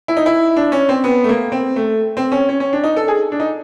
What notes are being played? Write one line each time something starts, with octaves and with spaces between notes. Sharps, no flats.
E4
D#4
E4
D4
C#4
C4
B3
A3
A#3
C4
A3
C4
C#4
C#4
C#4
D4
D#4
A4
G#4
D4
D#4